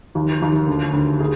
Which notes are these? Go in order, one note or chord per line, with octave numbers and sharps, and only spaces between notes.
D#2
D#2
D2
D2
G#4